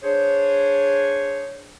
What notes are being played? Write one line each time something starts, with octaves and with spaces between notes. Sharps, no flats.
D4 G#4 C5 C#5